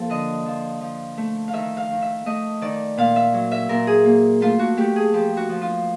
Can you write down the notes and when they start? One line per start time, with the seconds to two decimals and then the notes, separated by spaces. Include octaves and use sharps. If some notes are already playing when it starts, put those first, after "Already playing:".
Already playing: F3 A#3 A4
0.09 D3 D#5
0.46 F3
0.81 F3
1.17 A3
1.48 F5
1.53 D#3 E5
1.77 F5
1.90 D#3
2.02 E5
2.26 A3 D#5
2.61 D#3 D5
2.97 A#2 F5
3.16 E5
3.34 F#3
3.52 E5
3.69 A#2 A#4
3.87 G#4
4.05 A#3
4.41 A3 F4
4.59 F#4
4.77 A3 G4
4.96 G#4
5.13 F3 G4
5.37 F#4
5.49 F3
5.62 F4